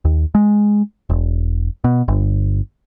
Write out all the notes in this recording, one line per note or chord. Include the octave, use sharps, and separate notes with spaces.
D#2
G#3
E1
B2
G1